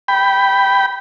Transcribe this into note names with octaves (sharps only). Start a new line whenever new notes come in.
G5 B5